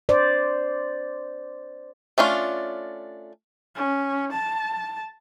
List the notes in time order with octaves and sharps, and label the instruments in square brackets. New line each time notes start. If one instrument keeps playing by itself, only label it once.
[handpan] C5 D5
[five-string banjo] A3 C#4 D4 F4
[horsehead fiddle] C#4
A5